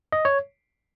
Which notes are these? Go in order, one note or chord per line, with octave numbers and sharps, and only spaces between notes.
D#5
C#5